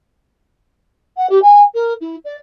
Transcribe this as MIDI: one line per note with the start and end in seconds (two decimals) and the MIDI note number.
1.17 1.27 78
1.30 1.41 67
1.42 1.62 80
1.74 1.93 70
2.01 2.16 64
2.25 2.34 74